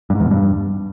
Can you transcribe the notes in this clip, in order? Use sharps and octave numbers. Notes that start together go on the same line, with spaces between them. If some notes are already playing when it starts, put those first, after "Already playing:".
G2
G#2
E2
B2
G2